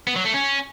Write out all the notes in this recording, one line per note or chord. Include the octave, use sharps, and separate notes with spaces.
B3
F#3
A3
C#4